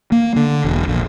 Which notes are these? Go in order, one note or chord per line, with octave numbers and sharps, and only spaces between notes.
A#3
D3
E1
A#1